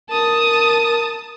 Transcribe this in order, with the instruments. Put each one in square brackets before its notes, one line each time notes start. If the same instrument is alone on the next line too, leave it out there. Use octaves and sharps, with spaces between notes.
[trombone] A#4 [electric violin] A5 D#6